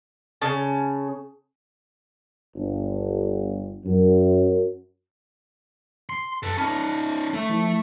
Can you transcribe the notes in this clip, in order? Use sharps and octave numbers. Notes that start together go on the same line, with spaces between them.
C#3 C#4 A5
G1
F#2
C6
F#2 A4 B4
C#4 D#4 A5 B5 F6
A3 E5
F3 E4